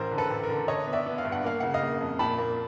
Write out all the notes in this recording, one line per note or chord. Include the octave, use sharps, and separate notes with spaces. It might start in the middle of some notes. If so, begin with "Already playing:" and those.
Already playing: A1 A#4 C5
D3
A4 B4
A1
A#4
D3
D3 C#5 D#5
B3
D5 E5
B3
F5
G2
F#5
A#3 F5
C#3 F#5
D#5 F5
A#3
F2
A#2 A5 B5
A#3